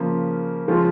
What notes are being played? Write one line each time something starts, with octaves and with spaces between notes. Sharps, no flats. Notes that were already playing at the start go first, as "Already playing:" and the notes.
Already playing: C#3 F3 A#3
C#3 F3 G#3 C#4 F4